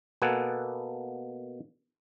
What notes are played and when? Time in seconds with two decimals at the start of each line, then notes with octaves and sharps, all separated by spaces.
0.22 B2 A#3 B3 A4 F#5 G#5